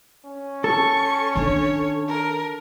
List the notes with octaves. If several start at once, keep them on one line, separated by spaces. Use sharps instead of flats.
C#4
A4 C#6
D#3 D4 C#5
A#4